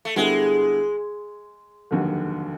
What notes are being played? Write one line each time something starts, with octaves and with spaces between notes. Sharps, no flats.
A3
D3 G3 G#3 B3 E4 A4
F1 D#2 D3 F#3